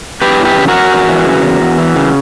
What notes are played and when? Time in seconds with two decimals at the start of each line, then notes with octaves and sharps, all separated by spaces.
0.21 E2 G4 B4
0.39 E3
0.45 G4 B4
0.56 C#3
0.68 F#4 A#4
0.74 E2
0.91 E2
1.09 E3
1.26 C#3
1.43 E2
1.61 E2
1.78 E3
1.96 C#3